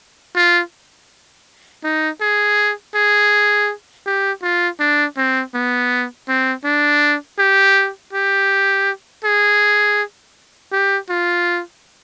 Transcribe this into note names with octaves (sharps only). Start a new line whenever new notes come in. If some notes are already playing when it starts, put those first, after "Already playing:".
F4
D#4
G#4
G#4
G4
F4
D4
C4
B3
C4
D4
G4
G4
G#4
G4
F4